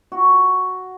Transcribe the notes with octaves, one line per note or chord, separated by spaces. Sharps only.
F#4